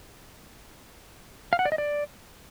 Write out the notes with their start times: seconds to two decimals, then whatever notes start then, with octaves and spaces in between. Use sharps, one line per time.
1.53 F5
1.59 F#5
1.65 D5
1.72 D#5
1.78 D5